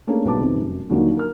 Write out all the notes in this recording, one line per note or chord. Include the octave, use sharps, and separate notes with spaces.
A3 A#3 C#4 D4 G#4 A4
B1 G3 B3 A5 D6
F2 C3 D#3
F1 F#2
D#2 D3 F3 F#3 A#3 D#4
A#4 F6